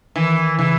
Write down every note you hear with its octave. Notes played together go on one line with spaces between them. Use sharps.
D#3 E3
C#3 E3